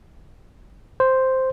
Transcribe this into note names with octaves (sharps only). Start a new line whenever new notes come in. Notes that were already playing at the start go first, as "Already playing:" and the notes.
C5